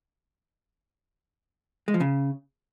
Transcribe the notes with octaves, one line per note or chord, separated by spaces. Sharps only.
G#3
F3
C#3